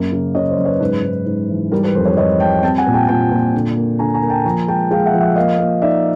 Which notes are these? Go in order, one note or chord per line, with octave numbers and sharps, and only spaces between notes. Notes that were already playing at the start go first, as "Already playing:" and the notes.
Already playing: F#2 A#3
C#3
C#3 C#5 D#5
C5 D5
F#2
B4 C#5
G#2 B4
G#2
G#2
E3
G3 A#4
B4
F2 A#4 C5
B4 C#5
F2 C#5 D#5
G3 G5 A5
C4 G5 A5
F#5 G#5
A#2
G5 A5
A#2 G5 A5
A#2
D3
A#3
D3 G#5 A#5
G#5 A#5
A#3
G5 A5
F3 G#5 A#5
G#3 G5 A5
G#3 F5 G5
E5 F#5
F3
E5 F#5
A#3 D#5 F5
A#3
D#4 D5 E5